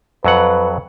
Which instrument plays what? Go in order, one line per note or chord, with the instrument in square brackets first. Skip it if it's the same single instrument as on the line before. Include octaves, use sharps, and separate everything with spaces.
[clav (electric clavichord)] F2 F#3 F#5 [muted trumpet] B4